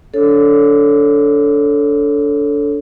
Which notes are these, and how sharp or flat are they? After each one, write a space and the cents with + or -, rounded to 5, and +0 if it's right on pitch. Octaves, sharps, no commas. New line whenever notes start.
D4 -25 A4 +0 C#5 +0